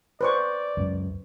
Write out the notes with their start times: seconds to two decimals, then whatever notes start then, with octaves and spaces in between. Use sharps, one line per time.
0.21 B4 C5 D5 C#6
0.77 C#2 F#2